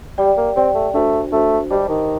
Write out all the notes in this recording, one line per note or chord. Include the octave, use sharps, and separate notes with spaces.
G3 G4 D5 G5
A#3
C4 G4 D5 G5
A3
A3 D4 F#4 C5
A3 D4 F#4 C5
G3 G4 C5 D#5 A5 D6
D#3